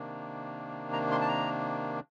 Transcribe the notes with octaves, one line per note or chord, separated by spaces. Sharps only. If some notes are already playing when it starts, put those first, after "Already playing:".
Already playing: C3 D#3 A#3 D4
A#5
C6
A5
A#5